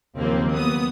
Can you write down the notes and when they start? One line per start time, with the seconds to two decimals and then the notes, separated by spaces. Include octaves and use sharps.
0.18 D#2 C#3 F3 F#3 A#3 C4
0.53 B3 D#6